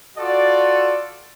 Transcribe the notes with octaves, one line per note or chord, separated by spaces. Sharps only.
F4 F#4 A4 D5